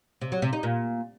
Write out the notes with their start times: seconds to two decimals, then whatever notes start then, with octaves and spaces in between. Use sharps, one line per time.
0.21 C3
0.32 F#3
0.42 C3
0.53 D#4
0.63 A#2